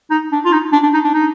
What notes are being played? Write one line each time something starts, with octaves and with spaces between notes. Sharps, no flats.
D#4
D4
F4
D#4
D4
D4
D#4
D4
D#4